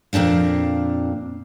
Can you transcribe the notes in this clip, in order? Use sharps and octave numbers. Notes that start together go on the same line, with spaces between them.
F2 A#2 C4 D4 F5